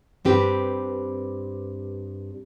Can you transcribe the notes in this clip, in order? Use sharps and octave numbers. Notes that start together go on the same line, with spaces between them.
G2 C4 G4 B4